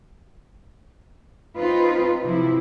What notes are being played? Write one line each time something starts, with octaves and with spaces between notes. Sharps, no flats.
C4 D#4 F4 B4
C3 F3 E4